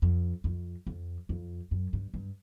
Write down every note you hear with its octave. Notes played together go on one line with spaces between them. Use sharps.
F2
F2
F2
F2
F#2
G2
G2